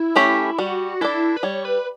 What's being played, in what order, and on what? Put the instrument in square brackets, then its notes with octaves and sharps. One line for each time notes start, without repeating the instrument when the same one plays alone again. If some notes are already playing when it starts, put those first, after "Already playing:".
Already playing: [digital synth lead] E4
[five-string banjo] A3 C#4 G4 C#5
[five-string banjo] G3 [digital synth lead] F#4
[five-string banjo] D4 A4 D5 [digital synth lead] E4
[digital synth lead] B4
[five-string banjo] G3 [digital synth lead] C#5
[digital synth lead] B4